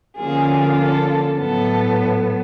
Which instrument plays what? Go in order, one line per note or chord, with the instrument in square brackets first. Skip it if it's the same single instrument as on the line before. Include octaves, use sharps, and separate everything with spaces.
[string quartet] D3 F3 A#3 C#4 F4 G#4
A4
A2 F#3 B3 A4